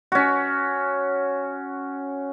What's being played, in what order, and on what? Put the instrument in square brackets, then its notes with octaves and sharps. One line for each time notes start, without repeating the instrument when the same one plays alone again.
[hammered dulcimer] C#4 F#4